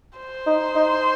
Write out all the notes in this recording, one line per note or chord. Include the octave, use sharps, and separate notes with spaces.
C5
D#4
D#4